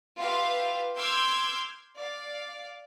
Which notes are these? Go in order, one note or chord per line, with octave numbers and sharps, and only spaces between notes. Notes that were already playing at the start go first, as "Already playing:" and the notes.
F4 G4 B4 E5 F5
C6 D6 E6 F6 G6 G#6
D5 F5